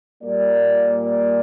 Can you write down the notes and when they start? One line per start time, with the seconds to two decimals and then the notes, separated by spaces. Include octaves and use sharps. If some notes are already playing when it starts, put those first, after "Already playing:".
0.23 A#2 G3 A#3 D5
1.03 D5